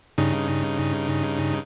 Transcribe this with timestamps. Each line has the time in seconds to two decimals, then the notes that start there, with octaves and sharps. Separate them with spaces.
0.18 G2 C#3 D#4